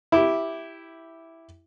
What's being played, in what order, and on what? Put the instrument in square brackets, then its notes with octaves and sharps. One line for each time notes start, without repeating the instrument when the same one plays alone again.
[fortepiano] E4 G4